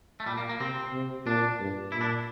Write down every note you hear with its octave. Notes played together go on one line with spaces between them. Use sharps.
A3
A#2 G3
A#3
A#3
C3 C4
C3
A#2 D4
G2
A#2 E4
D4